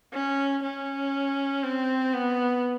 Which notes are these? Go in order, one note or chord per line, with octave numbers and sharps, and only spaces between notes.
C#4
C#4
C4
B3